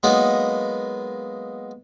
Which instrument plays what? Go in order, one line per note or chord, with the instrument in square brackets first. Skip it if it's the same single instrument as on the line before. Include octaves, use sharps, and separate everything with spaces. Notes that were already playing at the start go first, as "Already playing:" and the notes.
[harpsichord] F#3 G#3 A#3 B3 D#4